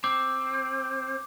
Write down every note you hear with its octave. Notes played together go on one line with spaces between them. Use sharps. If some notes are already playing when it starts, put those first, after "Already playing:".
C4 D6